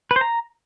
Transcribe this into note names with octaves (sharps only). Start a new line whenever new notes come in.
B4
C5
A#5